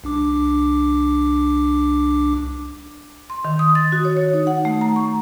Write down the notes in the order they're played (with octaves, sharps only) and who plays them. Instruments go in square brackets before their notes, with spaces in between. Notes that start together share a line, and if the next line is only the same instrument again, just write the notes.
[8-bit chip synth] C2 D4 D6
[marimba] C6
D#3
D#6
A6
F#4
C#5
C#5
D#4
F#5
A3
A#5
C#6